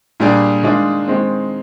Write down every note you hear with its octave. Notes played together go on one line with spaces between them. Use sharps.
A#2 G3 D4 G#4
D#3 G#3 D4 F4 G#4
D#3 G#3 C4